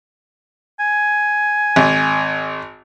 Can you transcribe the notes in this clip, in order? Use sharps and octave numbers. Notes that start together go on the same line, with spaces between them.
G#5
G#1